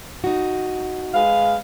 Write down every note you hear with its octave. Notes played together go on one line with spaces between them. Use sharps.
D#4 F#4
G#3 B4 F5